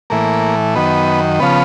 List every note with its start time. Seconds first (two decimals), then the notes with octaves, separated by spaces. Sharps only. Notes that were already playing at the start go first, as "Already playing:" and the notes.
0.10 A2 E3 A#3
0.76 F#2 D#3 B3
1.40 C#3 F3 B3